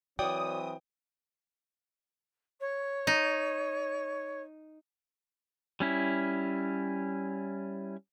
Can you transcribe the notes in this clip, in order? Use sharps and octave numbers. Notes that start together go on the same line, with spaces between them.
E3 F#3 C4 F#4 C#5 D5 G5 D#6
C#5
D#4
G3 C#4 E4